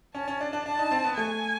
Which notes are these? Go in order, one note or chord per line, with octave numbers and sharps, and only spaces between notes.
C#4 A5
C#4
D4
D4
D4 A5
D#4
C4
B3
A3 G#5